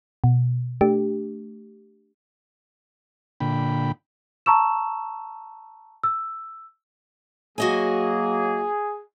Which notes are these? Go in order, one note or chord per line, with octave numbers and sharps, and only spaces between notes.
B2
A3 D4 G4
A#2 D3 G5 B5
A5 A#5 C#6 E6 E7
E6
F#3 A#3 F#4 G#4 D#5 G#5